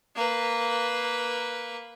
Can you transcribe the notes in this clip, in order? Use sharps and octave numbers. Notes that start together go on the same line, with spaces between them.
A#3 B4